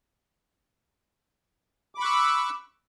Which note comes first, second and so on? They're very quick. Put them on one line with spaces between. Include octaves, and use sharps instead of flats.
D6 B5 C#6 F#6 E6